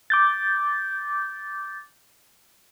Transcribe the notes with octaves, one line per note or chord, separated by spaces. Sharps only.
D6 G6 A6